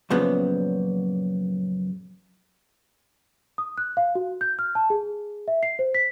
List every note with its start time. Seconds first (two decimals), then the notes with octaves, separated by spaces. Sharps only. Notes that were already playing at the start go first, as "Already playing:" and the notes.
0.10 F#2 A#2 C#3 F3 B3
3.58 D#6
3.78 F#6
3.97 F5
4.15 F#4
4.41 G6
4.59 F6
4.75 A5
4.90 G#4
5.48 E5
5.63 C7
5.79 C5
5.95 B6